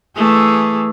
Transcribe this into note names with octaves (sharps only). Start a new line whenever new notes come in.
E3 A3 G#4